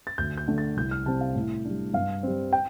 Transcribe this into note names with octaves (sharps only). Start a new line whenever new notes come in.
A6
D2 G6
G6
D3 A3
A6
C2 G6
F6
C3 G3 C4 A5
F5
A2
G3 D4
G2 F5
G3 C4
G5